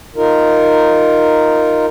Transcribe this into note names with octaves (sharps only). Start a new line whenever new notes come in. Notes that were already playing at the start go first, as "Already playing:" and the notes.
D#4 F4 A#4